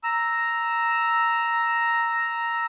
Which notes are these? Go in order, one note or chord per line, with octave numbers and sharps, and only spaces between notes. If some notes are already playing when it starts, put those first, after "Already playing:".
A#5 E6